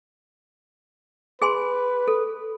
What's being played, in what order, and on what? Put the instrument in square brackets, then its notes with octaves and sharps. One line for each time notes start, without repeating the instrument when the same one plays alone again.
[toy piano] G#4 G#5 C6 [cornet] B4
[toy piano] A4